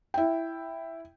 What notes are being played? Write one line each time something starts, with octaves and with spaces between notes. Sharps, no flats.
E4 G5